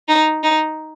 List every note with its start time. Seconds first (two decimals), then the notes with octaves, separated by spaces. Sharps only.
0.08 D#4
0.43 D#4